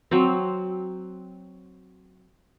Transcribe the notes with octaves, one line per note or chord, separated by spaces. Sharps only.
F#3 C4